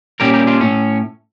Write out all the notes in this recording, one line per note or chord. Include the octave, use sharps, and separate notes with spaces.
A#2 G3 C#4 G4 A#4
G4 A#4
D4 F4
A2 C#4